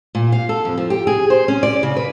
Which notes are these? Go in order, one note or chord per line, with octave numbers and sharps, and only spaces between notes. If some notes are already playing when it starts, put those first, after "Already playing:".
A#2
F5
A4
F2
F3
G4
G#4
C5
C#4
D5
C#3
B4